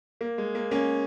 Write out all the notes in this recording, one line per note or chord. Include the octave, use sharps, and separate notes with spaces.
A#3
G#3
A#3
A#3 C#4